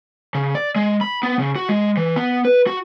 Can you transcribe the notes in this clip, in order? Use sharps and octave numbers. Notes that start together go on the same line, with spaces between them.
C#3
D5
G#3
B5
B3
C#3
F#4
G#3
E3
B3
B4
F#4